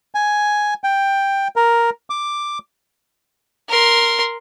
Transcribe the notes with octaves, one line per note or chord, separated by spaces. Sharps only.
G#5
G5
A#4
D6
A#4 C6